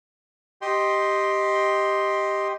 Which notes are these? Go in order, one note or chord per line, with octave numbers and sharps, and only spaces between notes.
G4 D#5 G5 C6